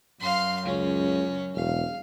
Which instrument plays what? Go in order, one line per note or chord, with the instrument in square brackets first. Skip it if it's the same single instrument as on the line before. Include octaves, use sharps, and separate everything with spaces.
[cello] F#2 [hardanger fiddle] F5 C6
[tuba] C#2 [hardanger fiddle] C#4
[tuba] E1 [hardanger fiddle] F5